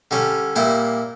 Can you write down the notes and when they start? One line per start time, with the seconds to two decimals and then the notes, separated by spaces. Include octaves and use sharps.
0.11 D3 G3 C#4
0.56 A#2 G3 A#3 E4